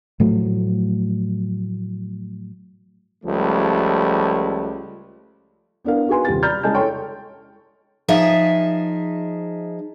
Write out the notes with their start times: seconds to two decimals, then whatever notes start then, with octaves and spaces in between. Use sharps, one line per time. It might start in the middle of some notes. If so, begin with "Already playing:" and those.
0.20 A2 F3 F#3 A3
3.25 C#2 F3 G3 A3
5.85 B3 D4 A#4 F5
6.08 D#4 F#4 G#4 B4 G#5 C6
6.25 D#1 C3 G3 A6
6.43 D5 A#5 B5 F6 G6 A6
6.63 C#3 G#3 D#5 G#5 A5 G6
6.75 A4 C#5 G5 C6 C#6
8.08 F3 D#4 G#4 E5